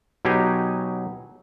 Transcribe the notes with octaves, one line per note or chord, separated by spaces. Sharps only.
B2 F#3 D#4 G4 G#4 G#5